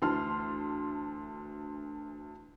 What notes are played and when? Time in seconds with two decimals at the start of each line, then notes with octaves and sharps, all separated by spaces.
0.02 D2 E3 A5 C6 F6